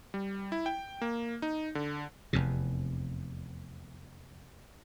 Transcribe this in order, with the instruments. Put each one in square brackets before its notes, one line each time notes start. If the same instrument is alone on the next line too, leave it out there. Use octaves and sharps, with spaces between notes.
[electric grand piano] G3
E4
G5
A#3
D#4
D3
[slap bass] F1 E2 C3